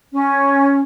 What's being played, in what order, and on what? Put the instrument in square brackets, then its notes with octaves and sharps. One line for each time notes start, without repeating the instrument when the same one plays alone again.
[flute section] C#4